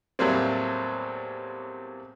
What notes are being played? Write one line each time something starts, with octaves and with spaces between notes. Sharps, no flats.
E2 A2 F#3 G3 A#3 C4